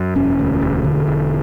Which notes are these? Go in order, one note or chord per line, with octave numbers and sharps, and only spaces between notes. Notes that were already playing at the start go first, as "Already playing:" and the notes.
Already playing: F#2
E1 C#4
D2
E1
D3
E1